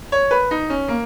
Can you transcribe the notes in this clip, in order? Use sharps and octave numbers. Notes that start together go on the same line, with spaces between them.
C#5
B4
D#4
C#4
A#3